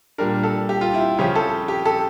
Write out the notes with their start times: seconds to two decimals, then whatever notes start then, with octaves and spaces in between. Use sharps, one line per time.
0.18 A#2 G3 D4 A#4
0.43 A4
0.69 G4
0.81 F4
0.94 E4
1.19 C#3 F3 C#4 G4
1.36 A4
1.68 G4
1.86 A4